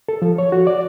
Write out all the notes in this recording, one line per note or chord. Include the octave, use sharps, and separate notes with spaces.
A4
F3
C#5
F#4
D5